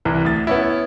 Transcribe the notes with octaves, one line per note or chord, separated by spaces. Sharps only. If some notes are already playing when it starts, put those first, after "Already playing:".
C2 E3 E4
D2 A6
B3 C#4 E4